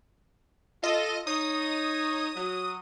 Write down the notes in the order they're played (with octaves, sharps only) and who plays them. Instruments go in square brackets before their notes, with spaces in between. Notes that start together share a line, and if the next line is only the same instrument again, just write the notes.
[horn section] F4 A4 [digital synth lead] D#5
[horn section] D#4 C#5 [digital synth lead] D#6
[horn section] F#3